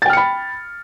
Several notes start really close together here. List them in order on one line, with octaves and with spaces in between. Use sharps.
A6 G5 F6 C#7 B5